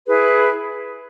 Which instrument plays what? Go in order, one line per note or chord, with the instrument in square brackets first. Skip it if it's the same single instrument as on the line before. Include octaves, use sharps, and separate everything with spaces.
[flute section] E4 G#4 B4